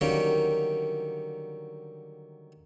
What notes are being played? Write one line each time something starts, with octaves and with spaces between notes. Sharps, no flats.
D3 D#3 F#3 G3 A#3 C#4